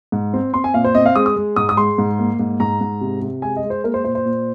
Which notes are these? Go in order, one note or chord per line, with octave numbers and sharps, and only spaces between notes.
G#2
C4
C4 C6
G#5
A#2 F5
C5
C4 D#5
F5
G#3 D#6
D#6
G#3
G#2 D#6
D#6
G#3 C6
G#2
A#3
G#2
G#2 A#5
G#2
C3
C3
G#3 G#5
D#5
G#3
C5
A#3 A#4
C5
A#2 C5
C5
A#2